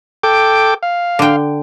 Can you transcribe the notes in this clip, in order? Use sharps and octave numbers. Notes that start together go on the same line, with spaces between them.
A4 G5 D6
F5
D3 G5